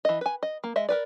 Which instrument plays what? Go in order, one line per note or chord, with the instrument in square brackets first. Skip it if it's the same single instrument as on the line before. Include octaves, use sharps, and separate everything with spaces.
[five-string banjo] E3 D#5
B4 G#5
D#5
A#3
G#3 D#5 E5
A#4 B4 D5